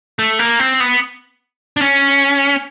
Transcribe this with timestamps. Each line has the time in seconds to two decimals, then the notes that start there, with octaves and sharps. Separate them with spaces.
0.19 A3
0.39 A#3
0.60 C4
0.80 B3
1.77 D4
1.82 C#4